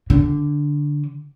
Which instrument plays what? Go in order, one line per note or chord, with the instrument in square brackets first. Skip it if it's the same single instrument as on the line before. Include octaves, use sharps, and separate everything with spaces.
[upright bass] D3